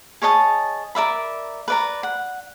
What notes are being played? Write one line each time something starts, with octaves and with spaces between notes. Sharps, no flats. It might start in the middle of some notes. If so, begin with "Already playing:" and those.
G#4 C#5 D#5 A5
A#4 D5 E5 B5
B4 D5 A#5
F#5